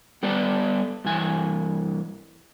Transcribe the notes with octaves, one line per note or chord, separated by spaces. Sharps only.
G3 B3 A4 B4 D5
G2 E3 G#5